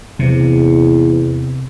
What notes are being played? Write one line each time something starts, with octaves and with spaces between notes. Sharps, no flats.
E2 C3